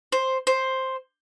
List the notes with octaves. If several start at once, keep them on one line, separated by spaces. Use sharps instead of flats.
C5
C5